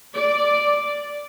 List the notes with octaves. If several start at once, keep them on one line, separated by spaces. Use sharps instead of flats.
D5